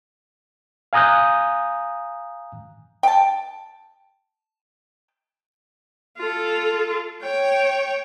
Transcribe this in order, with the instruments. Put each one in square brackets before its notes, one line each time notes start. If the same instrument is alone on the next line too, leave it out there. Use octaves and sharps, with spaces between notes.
[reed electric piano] F5 G#5 A#5 D#6 F#6 G6
[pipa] G5 A5
[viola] F4 A4
C#5 G5